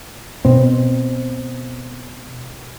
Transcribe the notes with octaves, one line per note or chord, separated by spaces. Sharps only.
B2 C4